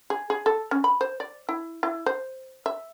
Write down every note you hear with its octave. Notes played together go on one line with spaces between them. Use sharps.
G#4
G#4
A4
C#4
B5
C5
D5
E4
E4
C5
E5